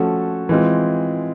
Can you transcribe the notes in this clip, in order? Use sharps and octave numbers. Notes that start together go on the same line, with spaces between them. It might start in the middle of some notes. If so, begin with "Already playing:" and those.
Already playing: F3 A3 C#4 F#4 A4
E3 G#3 C4 F4